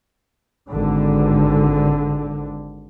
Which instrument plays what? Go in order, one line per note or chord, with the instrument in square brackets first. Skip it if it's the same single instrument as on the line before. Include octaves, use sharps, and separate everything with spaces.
[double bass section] G#1 D3